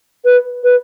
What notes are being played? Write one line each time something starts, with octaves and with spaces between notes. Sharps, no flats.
B4
B4